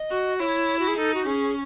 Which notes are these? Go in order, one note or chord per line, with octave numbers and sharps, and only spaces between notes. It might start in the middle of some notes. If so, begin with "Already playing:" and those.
Already playing: D#5
F#4
E4 C#5
F#4
G#4
D#4 A4
F#4
C#4 G#4